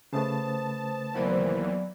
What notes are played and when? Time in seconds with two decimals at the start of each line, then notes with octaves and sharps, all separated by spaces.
0.13 C#3 A3 B4 C5 A5 D#6
1.14 D#2 E3 F#3 A#3 B3 A#4 C5 D5